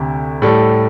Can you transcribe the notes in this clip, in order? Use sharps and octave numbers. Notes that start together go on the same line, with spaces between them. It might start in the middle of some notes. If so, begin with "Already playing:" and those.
Already playing: D2 C3
A2 G3 A4